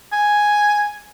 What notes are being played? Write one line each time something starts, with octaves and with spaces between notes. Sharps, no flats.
G#5